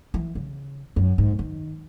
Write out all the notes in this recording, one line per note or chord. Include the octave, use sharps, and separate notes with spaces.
E3
C#3
F#2
G#2
D#3